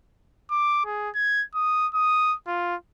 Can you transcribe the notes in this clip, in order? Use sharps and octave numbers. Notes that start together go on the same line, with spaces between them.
D6
G#4
G#6
D#6
D#6
F4